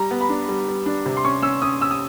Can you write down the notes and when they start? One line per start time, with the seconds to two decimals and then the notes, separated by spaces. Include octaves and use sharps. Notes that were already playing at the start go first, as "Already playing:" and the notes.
Already playing: G3 A#5
0.11 B3
0.21 B5
0.29 D4
0.49 G3
0.68 G3
0.86 D4
1.06 C3
1.17 C6
1.24 C#4 C#6
1.42 C#4 E6
1.62 C#4 D#6
1.81 C#4 E6
1.91 D#6